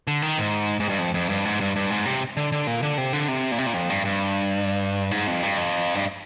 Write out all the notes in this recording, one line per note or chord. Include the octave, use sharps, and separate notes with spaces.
D3
D#3
G#2
G#2
G2
F2
F2
G2
G#2
G2
G2
G#2
C3
D3
D3
A#2
D3
C3
D3
C3
A#2
C3
A#2
F2
G2
G2
G#2
F2
G2
F2
G2